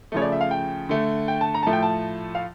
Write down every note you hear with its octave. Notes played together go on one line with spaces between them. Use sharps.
C#3 F3 A3 C#5
D5
E5
F5
G5
D3 A3
G5
A5
A#5
A2 F3 A3 A5
G5
A5
F5